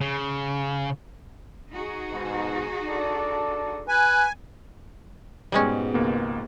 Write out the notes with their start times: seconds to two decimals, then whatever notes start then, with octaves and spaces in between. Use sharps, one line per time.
0.01 C#3
1.71 D#4 F#4 G#4
2.11 G#2 B2
2.88 D4 A4 D5
3.89 B4 G#5
5.52 G#2 B2 G3 G#3 C#4
5.94 C#2 A#3 B3